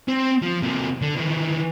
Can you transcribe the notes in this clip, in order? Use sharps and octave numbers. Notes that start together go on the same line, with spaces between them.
C4
F3
C3 A#3
D3
D#3 E3